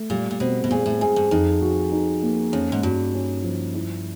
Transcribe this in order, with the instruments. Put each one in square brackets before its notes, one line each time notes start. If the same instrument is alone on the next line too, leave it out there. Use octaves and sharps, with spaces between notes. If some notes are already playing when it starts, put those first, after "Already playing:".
Already playing: [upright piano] A3
[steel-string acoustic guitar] A#2 [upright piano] G3
[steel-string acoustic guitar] A#2
[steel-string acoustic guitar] B2 [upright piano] C4
[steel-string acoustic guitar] B2
[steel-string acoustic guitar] A#2 [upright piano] G#4
[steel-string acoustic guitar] A2
[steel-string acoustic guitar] G#2 [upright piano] G#4
[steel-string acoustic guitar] G2
[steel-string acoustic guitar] F2 [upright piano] D#4
[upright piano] F#4
D#4
A#3
[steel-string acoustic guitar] F2 [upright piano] C#4
[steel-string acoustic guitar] G#2
[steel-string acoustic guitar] G2 [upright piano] F#4
[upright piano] C#4
F3
E4